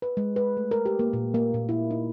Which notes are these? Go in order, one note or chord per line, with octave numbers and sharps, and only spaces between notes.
B4
G#3
B4
A3
A#4
G4
A#3
A#2
A#3
A#2
E4
D#4